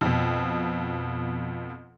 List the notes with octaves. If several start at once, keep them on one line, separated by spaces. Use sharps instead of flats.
F2 B2